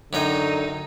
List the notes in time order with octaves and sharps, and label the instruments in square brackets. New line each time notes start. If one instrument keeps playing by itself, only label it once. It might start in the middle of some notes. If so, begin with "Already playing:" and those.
[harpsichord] F#2 F#3 G5 [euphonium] D3 [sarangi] D#4